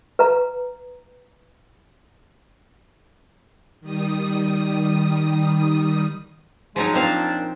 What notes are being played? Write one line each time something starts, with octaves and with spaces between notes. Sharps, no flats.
B4 F5 A#5
D#3 G3 D#6
F3 F#3 G#3 D#4
A#2 C4 D4 F5